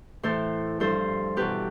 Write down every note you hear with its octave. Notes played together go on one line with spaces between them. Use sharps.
A2 E3 A4 C5
G2 F3 A4 C5
E2 B2 G4 B4